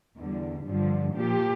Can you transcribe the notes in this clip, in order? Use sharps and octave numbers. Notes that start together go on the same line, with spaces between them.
E2 D3 G3
G2 D3 F3
A#2 F3 G4